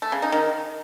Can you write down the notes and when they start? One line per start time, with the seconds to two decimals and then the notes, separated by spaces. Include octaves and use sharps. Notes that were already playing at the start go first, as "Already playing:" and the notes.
0.02 A3
0.12 C#3
0.22 D#4
0.32 D#3